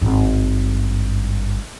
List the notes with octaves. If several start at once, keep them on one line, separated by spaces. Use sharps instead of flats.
G#1 G2